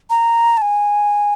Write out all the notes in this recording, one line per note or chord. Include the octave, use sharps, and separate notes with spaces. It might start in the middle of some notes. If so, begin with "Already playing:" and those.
A#5
A5
G#5